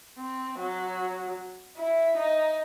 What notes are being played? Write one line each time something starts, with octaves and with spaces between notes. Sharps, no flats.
C4
F#3
E4
D#4